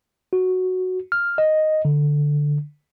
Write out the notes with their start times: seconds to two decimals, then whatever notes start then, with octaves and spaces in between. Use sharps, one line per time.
0.33 F#4
1.12 F6
1.38 D#5
1.85 D3